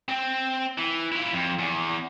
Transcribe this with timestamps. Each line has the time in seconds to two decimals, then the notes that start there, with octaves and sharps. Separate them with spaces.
0.09 C4
0.78 E3
1.12 E4 F4
1.33 F2
1.59 E2